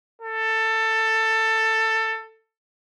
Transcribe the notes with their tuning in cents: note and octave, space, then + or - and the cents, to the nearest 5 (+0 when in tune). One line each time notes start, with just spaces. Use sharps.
A4 +15